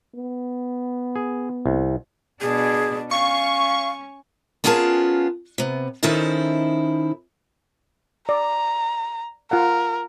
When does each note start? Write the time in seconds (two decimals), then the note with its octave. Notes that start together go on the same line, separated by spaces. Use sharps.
0.15 B3
1.16 G#4
1.66 C2
2.41 B2 D4 G#4
3.11 C#4 F5 C#6
4.64 B3 C#4 F4 G#4 A#4 A5
5.58 C3 B3
6.03 D#3 C#4 D#4 E4 A4 C5
8.29 D5 A#5
9.51 F4 A#4 F5 F#5